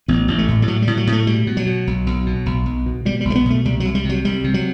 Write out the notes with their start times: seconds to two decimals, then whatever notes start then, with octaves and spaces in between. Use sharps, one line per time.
0.08 A1 B3
0.28 A1
0.38 A3
0.48 A2
0.62 G3
0.68 A2 F#3
0.82 G3
0.87 A2
0.97 F#3
1.07 A2
1.12 A3
1.27 B2 G3
1.47 B2
1.57 F#3
1.66 B2
1.87 B1
2.06 B1
2.26 B2
2.46 B1
2.66 B1
2.86 B2
3.05 B2 G3
3.21 G3
3.25 B1
3.30 A3
3.35 B3
3.46 B2 A3
3.65 C2 G3
3.80 C2 F#3
3.95 G3
4.05 C3 F#3
4.25 C2 G3
4.44 C3
4.54 F#3